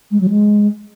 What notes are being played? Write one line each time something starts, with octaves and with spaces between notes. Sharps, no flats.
G#3
F#3
G#3